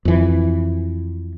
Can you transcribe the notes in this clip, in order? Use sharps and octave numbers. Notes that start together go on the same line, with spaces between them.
F2 E3